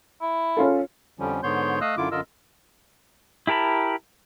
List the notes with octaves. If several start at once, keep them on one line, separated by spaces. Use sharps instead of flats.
E4
C#4 F4 A4
F2 D3 F3 G3 C#4
G#2 D3 B3 C#5 C6 G6
A3 D#5 F5 D#6 E6 F#6
F#2 D3 E4 F4 D6
F#2 D3 F4 A#4 D#5 E6
E4 G4 A#4 A5 B5